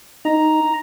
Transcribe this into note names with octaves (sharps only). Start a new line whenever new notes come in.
D#4 A#5